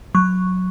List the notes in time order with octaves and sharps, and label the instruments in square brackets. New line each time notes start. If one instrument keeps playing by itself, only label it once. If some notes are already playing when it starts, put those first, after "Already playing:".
[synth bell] F#3 C#6